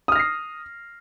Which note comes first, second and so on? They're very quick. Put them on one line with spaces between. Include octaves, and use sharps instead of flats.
D#6 F6 A#6 C7